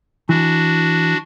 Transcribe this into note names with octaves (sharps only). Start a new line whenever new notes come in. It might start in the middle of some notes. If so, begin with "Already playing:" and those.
E3 D4 F#4